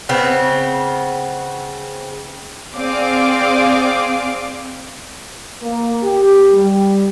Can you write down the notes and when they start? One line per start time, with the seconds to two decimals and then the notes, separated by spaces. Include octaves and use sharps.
0.09 C#3 B3 C4
2.76 C4 G#4 D5 F5 D6
5.61 A#3
6.03 G4
6.52 G3